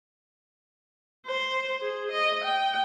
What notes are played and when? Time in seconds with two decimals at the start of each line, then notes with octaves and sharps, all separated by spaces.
1.26 C5
1.81 G#4
2.11 D#5
2.44 G5